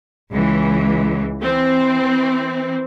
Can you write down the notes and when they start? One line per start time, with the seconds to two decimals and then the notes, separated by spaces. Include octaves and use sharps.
0.32 C#2 E3
1.41 E3 C4